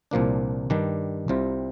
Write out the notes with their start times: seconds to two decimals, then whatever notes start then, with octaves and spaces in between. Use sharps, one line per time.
0.11 C2 A#2 F3 A#3 D4
0.70 G2 D#3 G3 D4
1.28 C2 C3 G3 C4 F4